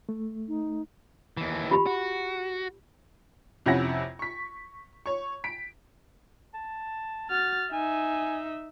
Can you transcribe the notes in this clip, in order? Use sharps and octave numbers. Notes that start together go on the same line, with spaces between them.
A3
D#4
D#2 E3
F4 G4 B5
F#4
F2 C3 C#4 E4 F#5 A#6
C#6 B6
C#5 C#6
B6 D7
A5
F#4 F6 A6
D#4 E5 G#5